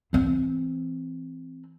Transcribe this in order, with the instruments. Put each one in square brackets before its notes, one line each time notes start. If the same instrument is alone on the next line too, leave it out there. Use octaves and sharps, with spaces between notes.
[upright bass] E3 C4